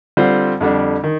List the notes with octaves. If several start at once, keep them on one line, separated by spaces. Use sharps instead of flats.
D3 G3 C4 F4 C5
F2 D3 G3 D4
D#3